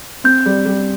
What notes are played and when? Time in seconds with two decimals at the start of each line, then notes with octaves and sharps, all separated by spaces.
0.24 C4 G6
0.46 G3
0.65 G3